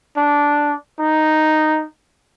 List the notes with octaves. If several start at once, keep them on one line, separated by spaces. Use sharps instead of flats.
D4
D#4